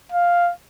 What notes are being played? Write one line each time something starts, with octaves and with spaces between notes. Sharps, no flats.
F5